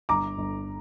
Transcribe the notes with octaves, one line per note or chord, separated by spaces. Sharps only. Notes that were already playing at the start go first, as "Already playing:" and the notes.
G1 A#5 D6
G1